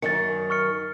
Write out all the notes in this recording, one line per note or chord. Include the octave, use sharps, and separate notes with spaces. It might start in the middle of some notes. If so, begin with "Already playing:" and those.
F#2 D#3 A6 C#7
C#6 F6 C#7